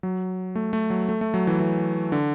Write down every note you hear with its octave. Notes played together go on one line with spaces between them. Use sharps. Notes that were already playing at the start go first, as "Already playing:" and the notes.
F#3
A3
A3
F#3
A3
A3
F#3
E3
E3
D3